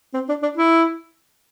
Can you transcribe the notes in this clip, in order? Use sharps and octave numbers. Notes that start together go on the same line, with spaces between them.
C4
D4
D4
E4